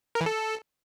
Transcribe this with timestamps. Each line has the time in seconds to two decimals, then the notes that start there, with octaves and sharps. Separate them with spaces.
0.15 A#4
0.21 E3
0.26 A4